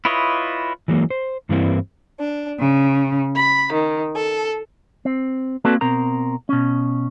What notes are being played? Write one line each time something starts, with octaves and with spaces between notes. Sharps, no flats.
E4 F4 B4 C#5 D#5
E3 F#3 G#3 A#3
C5
G2 E3 G3 A#3 C4 E4
D4
C#3
B5
D#3
A4
C4
A#3 C4 F#4 A4 B4 D5
B2 C4 A#4 A#5
B2 C#4